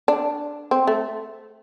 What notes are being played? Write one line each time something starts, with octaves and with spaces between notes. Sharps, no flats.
D4
C4
A3